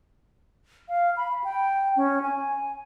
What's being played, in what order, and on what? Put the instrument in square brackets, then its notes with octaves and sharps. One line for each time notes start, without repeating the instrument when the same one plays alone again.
[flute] F5
B5
G5
C#4
G#5